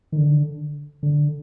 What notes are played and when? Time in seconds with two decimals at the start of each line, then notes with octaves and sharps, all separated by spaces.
0.12 D#3
0.18 D3
1.03 D3